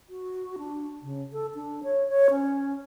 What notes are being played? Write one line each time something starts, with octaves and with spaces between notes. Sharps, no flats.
F#4
D4
C#3
A4
D4
C#5
C#5
C#4